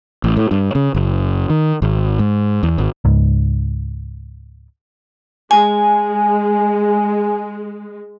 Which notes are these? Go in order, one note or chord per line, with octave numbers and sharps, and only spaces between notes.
A1
A2
G2
C#3
F#1
D#3
G#1
G#2
E2
G#1
C#2 G#2
G#3 G#5